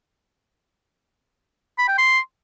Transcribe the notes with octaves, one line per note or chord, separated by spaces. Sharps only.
B5
G5
C6